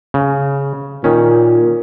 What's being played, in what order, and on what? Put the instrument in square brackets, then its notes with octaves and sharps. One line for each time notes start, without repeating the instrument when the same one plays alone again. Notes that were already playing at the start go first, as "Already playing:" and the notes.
[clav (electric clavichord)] C#3
[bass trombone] A#2 [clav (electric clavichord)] D#3 C#4